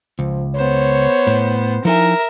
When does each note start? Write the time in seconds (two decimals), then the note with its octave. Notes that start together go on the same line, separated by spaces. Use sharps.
0.19 C#2 F3
0.56 B3 C5 C#5
1.27 A2
1.85 F3 D#4 E4 A#4 E5 G#5